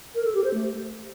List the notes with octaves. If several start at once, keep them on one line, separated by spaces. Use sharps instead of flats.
A#4
A4
G4
C5
A3